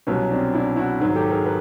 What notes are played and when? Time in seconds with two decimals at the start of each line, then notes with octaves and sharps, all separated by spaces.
0.07 C2 B2 F#3 B3 C#4
0.31 C4 D4
0.54 D4 E4
0.76 E4 F#4
1.00 G#2 D#3 F#3
1.15 G4 A4
1.30 G#4 A#4
1.45 B4